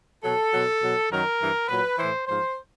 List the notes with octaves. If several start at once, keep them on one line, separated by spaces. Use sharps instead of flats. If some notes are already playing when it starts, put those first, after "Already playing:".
B2 F#3 A4
B2 F#3
B2 F#3
F#2 D#3 F#3 A#4
G2 E3
A#2 F#3 B4
A2 E3 C5
G#2 F3 C5